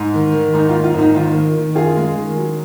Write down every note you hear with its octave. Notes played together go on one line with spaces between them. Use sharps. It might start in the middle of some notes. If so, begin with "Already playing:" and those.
Already playing: G#2
D#3
D#3
G#2 D#4
F4
A#3
F4
G#1
D#4
D#3 F4
D#3
D#3
F#2 F4 G#4
G#3
D#3
F#3